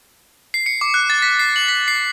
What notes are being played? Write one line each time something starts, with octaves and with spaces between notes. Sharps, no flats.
C7
C#7
D6
F#6
A6
B6
C7
F#7
B6
C7